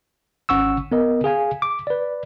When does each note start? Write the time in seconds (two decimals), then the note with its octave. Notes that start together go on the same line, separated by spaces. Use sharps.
0.49 G#1 C#4 F#5 C#6 E6
0.92 B3 A#4 D#5
1.24 G#4 F5 G#5
1.62 D6
1.87 B4 D5